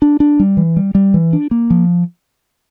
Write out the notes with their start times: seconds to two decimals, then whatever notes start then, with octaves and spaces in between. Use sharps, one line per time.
0.02 D4
0.20 D4
0.40 G3
0.57 E3
0.77 G3
0.95 G3
1.14 E3
1.33 D4
1.51 A#3
1.70 F3